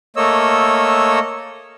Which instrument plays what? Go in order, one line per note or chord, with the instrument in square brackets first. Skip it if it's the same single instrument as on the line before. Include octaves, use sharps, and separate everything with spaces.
[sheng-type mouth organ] A3 A#3 C#5 D#5 E6